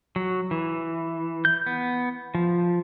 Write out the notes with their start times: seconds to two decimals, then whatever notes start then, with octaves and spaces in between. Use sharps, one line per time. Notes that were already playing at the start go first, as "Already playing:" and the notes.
0.16 F#3
0.51 E3
1.45 G6
1.66 B3
2.35 F3